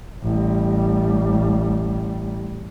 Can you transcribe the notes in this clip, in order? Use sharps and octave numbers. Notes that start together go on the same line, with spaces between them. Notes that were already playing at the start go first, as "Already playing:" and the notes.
A1 G3